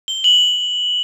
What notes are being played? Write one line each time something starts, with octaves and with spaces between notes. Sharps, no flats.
G7
F#7